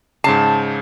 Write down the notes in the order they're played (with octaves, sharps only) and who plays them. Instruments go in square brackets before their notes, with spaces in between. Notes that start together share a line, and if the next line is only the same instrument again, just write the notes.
[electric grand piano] G#2 C#3 C7 [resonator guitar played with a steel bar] A5